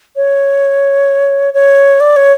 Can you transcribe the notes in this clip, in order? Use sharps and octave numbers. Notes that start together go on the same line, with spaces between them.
C#5
C#5
D5
C#5